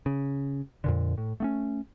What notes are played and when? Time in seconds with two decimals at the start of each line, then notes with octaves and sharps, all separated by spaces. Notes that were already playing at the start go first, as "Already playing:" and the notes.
0.06 C#3
0.84 F2 A#2 D3
1.18 A2
1.40 A3 B3 C#4